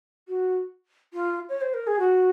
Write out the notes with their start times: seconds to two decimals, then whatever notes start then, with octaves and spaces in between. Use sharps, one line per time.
0.28 F#4
1.14 F4
1.49 C#5
1.61 C5
1.74 A#4
1.87 G#4
1.99 F#4